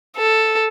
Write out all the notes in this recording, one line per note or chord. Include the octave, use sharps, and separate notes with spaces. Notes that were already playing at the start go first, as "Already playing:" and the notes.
A4